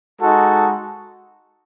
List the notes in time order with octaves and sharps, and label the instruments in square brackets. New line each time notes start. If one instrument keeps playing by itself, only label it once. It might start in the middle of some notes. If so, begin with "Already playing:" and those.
[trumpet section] G#3 D#4 F#4 A4